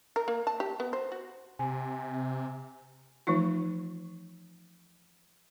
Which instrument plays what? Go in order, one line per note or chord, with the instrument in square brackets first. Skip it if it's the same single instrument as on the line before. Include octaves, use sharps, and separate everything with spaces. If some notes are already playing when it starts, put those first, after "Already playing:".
[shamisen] A#4
A#3
A5
G4
B3
C5
F#4
[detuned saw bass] C3 [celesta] G#5
[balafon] E3 F3 A3 D#4 F4